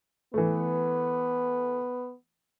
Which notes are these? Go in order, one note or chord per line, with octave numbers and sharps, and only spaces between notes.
E3 A3 B3